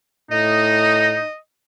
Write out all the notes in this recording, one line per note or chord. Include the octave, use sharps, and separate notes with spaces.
A2 D#4 D#5